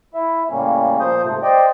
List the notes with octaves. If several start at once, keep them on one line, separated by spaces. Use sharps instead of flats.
E4 E5
A2 C#3 G3 A#3 C#4
A#2 F3 A#3 C5 D#6 G6
G#2 C3 A3
C5 D5 D#5 G5